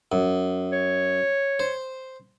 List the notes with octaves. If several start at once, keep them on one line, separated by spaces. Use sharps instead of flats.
F#2
C#5
C5